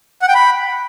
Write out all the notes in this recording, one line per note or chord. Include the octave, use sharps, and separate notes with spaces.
F#5
G5
B5